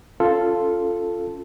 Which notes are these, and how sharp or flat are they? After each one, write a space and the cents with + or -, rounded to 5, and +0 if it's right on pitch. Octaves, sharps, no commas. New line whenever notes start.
C#4 +0 F4 +0 A4 +0